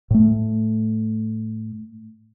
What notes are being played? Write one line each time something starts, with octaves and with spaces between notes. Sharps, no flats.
A2 A3